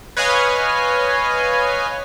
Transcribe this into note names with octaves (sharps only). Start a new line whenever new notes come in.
B4 C#5 D#5 F5 G#5